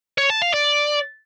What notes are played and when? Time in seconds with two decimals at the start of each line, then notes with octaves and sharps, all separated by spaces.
0.18 C#5
0.30 A5
0.42 F5
0.54 D5